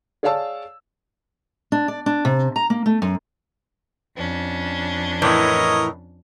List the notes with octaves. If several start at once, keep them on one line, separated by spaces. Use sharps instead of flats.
G#4 C#5 D5 F5 A5 E6
D4
D5
D4
C3
A#5
A#3
A3
F#2
F2 C#4 D4
A2 E3 A#4 C#5 D#5